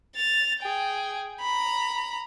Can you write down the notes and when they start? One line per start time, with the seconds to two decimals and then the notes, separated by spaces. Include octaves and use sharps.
0.15 A6 F7
0.60 G#4 G5
1.41 A#5 B5